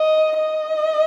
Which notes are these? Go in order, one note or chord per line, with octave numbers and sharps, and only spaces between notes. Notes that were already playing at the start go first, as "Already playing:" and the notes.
Already playing: D#5
D#5